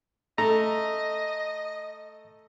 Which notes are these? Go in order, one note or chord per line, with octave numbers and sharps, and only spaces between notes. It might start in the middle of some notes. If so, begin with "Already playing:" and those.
A3 D#5 A#5